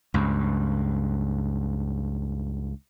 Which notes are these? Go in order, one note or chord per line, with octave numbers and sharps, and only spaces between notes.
C#2 G2